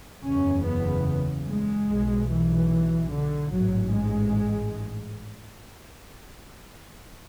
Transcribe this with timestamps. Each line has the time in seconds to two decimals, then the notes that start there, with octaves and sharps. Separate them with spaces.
0.24 F#1 E2 C#3 C#4
0.65 B3
1.47 G#3
1.88 B1 B2
2.29 E3
3.11 D3
3.51 A1 G#2 F#3
3.92 G#3